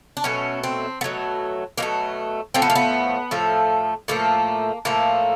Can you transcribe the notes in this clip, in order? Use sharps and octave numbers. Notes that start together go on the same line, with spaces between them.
D4
B2 F#3 A3 C#4
C4
B2 F#3 A3 B3
B2 F#3 A3 A#3
A2 F3 A3 C4
B3
A#3
B3
A2 F3 A3
A2 F3 A3 A#3
A2 F3 A3 A#3